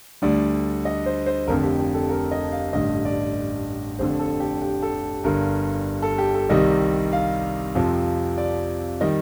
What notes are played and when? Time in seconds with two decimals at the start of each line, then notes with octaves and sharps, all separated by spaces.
0.22 D2 D3 G3 D5
0.85 D#5
1.06 C5
1.26 C5
1.47 F1 F2 D3 A#4
1.63 G4
1.79 G4
1.94 A4
2.10 A#4
2.31 D#5
2.52 F5
2.73 A1 G2 D3 D#5
3.05 D5
3.99 F1 F2 D3 C5
4.19 A4
4.40 G4
4.62 G4
4.82 A4
5.24 G1 G2 D3 A#4
6.02 A4
6.18 G4
6.34 A4
6.49 C2 C3 D#3 G3 D#5
7.13 F5
7.75 F2 C3 F3
8.38 D5
9.01 D#3 G3 D#5